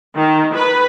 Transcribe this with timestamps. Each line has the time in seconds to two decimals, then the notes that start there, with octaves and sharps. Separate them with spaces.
0.15 D#3
0.54 B4